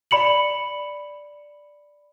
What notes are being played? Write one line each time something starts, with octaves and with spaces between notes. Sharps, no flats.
D5 B5 C#7 F#7